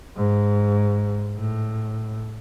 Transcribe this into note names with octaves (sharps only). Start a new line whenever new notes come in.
G#2
A2